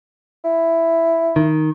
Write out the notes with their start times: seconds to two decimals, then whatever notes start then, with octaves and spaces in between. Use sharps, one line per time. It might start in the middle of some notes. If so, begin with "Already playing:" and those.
0.44 E4
1.36 D#3